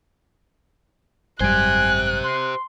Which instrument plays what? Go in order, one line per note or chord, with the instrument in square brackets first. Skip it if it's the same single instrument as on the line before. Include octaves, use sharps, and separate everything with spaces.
[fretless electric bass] G#1 F#2 G3 [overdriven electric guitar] G4 C5 [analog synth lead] G#5 [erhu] F#6
[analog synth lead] C6